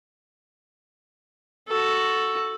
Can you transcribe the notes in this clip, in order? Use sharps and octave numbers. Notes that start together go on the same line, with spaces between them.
F#4 A4